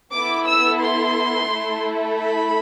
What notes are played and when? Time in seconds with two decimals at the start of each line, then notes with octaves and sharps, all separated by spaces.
0.13 B3 E4 A4 D6
0.48 E6
0.82 C6
1.50 A3 E4 A4
2.20 B5